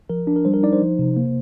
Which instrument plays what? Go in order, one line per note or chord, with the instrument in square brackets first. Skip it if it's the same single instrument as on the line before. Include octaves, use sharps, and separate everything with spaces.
[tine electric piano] F3 A#4
D4
A#4
G3 C5
A#4
D#4 D5
C5
F3
C3
A#3